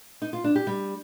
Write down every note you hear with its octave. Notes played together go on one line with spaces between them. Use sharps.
D#4
F4
D4
G4
G3